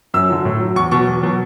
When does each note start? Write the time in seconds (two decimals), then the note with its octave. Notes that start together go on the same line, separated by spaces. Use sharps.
0.14 F#2 E6
0.29 D3 F#3
0.45 A2
0.60 F#3
0.76 E2 C#6
0.91 B2 F#3 C#6
1.07 E2
1.23 B2 F#3